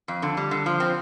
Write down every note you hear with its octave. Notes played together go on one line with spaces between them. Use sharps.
F2
D3
G3
D3
F3
C4